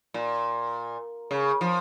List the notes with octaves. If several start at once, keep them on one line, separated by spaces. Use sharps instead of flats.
A#2
C#3
F3